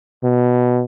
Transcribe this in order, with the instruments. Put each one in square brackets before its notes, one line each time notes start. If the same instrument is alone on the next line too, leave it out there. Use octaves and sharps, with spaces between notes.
[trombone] B2